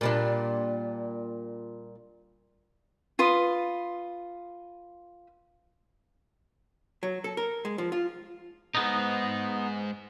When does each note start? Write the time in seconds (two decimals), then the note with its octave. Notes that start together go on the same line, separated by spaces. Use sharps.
0.01 A#2 G3 D4
3.19 F4 B4 C6 D#6
7.03 F#3
7.24 A4
7.37 A#4
7.65 G#3
7.78 F3
7.92 F4
8.75 B1 G#2 B3 D#4